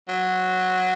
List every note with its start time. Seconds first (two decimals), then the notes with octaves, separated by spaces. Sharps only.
0.08 F#3